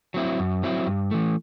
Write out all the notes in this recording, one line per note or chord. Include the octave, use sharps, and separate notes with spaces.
F#3 C4 E4
F#2
F#3 C4 E4
G2
E3 A3